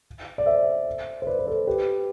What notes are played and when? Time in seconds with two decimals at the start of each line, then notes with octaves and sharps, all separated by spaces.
0.38 D5
0.46 C5 E5
1.22 C5
1.27 B4 D5
1.39 B4
1.47 A4 C5
1.67 G4 B4